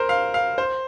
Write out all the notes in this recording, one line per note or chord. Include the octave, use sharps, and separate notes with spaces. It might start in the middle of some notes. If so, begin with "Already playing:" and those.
Already playing: A#4 C5
F5
F5
C5